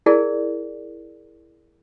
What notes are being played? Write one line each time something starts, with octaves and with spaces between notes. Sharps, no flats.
E4 G#4 A#4 D5